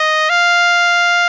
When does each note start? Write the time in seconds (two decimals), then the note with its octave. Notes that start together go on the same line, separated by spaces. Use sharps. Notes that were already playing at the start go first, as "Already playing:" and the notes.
Already playing: D#5
0.30 F5